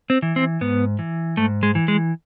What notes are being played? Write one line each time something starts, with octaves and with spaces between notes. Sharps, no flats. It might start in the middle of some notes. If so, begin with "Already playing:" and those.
C4
E3
C4
G#2 B3
E3
G#2 A3
G#3
E3
G#3